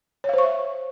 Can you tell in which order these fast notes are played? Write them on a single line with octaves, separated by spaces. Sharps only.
C#5 F5 C5 C#6 E5